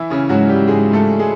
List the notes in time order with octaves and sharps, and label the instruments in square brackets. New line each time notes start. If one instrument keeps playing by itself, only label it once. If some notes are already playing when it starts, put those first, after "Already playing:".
Already playing: [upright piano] E3 E4
C#3 C#4
[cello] G#2 [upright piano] F#3 F#4
[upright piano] G3 G4
[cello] G#2 [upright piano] G#3 G#4
[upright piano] A3 A4
G#3 G#4